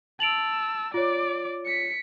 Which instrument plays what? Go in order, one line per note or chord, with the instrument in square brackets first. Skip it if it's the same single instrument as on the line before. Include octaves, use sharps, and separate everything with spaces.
[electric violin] A5 E6 [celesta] D7 F7 F#7
[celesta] F4 C#5 [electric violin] D5 D6
[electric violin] B6 C#7